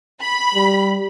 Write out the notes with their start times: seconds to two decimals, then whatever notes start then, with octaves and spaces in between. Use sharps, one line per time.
0.23 B5
0.55 G3